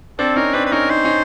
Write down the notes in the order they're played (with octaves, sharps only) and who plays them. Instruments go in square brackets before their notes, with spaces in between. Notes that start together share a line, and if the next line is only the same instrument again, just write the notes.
[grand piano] C4 D4 [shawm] A4
[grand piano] C#4 D#4 [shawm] A#4
[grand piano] C4 D4 [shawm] B4
[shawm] B4
[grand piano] C#4 D#4 [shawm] A#4
[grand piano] D#4 [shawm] C5
[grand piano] C#4 D#4